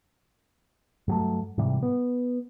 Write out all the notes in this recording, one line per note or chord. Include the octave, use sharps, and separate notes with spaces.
G2 F#3 A3
G#2 C3 E3 G3
B3